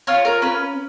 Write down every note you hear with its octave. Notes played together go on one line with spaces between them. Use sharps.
F4 C#5
A#4
C#4 B4